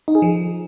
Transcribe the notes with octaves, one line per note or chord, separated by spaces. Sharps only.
D#4
G#4
F3